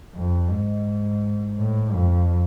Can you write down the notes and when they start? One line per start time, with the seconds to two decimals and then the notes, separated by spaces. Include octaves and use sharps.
0.15 F2
0.50 G#2
1.58 A2
1.94 F2